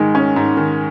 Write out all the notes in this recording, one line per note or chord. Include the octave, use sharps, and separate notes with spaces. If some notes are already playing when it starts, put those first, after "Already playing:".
Already playing: G#2 D#3 G#3
C#4
G#2
D#3